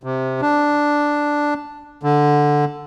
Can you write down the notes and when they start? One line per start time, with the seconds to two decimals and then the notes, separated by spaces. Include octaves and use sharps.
0.03 C3
0.41 D4
2.03 D3